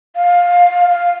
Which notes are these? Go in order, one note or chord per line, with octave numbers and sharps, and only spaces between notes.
F5
F5